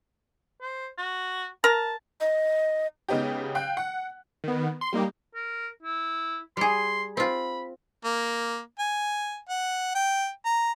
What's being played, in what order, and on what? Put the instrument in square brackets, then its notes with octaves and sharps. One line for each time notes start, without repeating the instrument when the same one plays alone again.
[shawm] C5
F#4
[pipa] A#4 A#5 [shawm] A5
[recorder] D#5
[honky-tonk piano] C#3 G#3 B3 D#4 G4
F5 G5 F#6
F#5
[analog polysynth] D#3 B3
C6
G3 A#3 D#4 G4
[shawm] A#4
E4
[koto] G3 G#4 [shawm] C6
[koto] C4 F4 [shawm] B5
[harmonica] A#3
G#5
F#5
G5
A#5